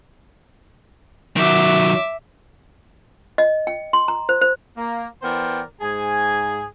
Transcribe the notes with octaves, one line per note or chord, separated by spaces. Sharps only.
D#3 F#3 E5 D6
D#5
G5
C6
A#5
C5
C5
A#3
E3 B3 A#4 C5 D5 G5
G#2 G#4 G#5